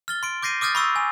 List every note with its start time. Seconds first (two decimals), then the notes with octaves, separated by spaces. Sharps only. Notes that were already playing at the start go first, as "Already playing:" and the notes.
0.08 F6 A6 G7
0.23 C6 D7
0.42 D6 G6 A#6 C7 D#7
0.61 D6 D#6 F6 G6 A6
0.75 B5 C#6 E6 A6
0.96 G#5